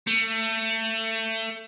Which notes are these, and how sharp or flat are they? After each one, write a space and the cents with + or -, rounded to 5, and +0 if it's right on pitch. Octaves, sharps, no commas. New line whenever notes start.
A3 +25